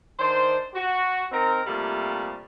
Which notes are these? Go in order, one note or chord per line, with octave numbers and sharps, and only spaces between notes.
D#3 D4 C5
F#4
C4 D#4 A#4
C3 F3 G3 A3 A#3